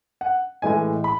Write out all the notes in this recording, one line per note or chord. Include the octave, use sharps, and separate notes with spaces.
F#5
A2 E3 G#3 G#5
B5